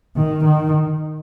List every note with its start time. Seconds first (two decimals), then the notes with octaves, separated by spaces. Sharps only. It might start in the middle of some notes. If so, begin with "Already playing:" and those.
0.16 D#3
0.45 D#3